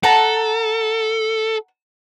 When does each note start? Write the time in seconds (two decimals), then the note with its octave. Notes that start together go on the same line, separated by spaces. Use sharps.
0.03 A4 F#5 A5 A#5